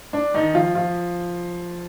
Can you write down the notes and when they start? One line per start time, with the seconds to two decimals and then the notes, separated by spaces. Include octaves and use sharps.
0.13 D4
0.34 D#3 D#4
0.54 F3 F4
0.75 F3 F4